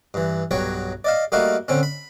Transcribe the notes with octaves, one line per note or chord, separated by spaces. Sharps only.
G2 E3
B1 G2 F#3 C#5 G5
D5 D#5 F5
G3 A3 A#3 D#4 F#4 F5
D3 C4 C#4
B5